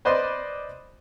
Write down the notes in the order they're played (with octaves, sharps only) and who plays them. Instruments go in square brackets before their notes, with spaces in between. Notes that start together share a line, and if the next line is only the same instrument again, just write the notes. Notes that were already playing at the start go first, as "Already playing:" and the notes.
[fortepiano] B4 C5 D5 D#5 C6